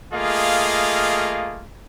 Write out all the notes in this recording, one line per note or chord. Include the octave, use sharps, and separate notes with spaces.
A3 A#3 F4 G#4 D#5 F5